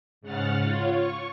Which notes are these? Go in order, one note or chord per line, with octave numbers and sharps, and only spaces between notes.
G#2 C#3 F#5 F6 A6
F4 C#5
C#6